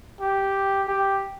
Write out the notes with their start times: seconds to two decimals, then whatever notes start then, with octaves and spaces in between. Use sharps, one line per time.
0.21 G4
0.88 G4